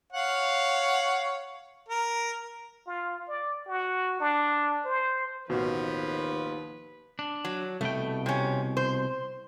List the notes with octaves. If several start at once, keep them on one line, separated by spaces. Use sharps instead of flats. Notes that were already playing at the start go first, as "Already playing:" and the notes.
C#5 F5 F#5
A#4
F4
D5
F#4
D4
C5
A1 D#2 B2 F3 F#4 B4
D4
F#3
C2 B2 A3 G5
C3 C#4
C5